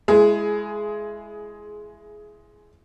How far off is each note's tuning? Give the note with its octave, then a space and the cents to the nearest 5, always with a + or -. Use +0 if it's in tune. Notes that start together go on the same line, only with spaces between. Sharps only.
G#3 +10 E4 +25 G#4 +20